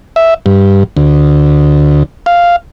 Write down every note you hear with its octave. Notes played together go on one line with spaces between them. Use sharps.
E5
G2
D2
F5